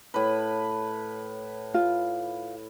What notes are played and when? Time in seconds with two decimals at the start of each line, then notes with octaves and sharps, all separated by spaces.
0.14 A2 B4
1.74 F4